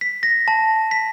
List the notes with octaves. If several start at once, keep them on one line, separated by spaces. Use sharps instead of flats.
B6
A#6
A5
B6